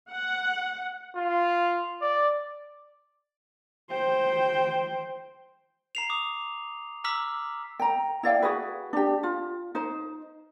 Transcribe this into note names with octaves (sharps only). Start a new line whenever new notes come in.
F#5
F4
D5
C5 G5
A#5 C7 F7
D6 D#6
A#5 D6 E6 F6 B6 F#7
G5 A#5
E4 D5 F5 G5
F#4 G#4 B4
D4 G4
F4
D#4 C5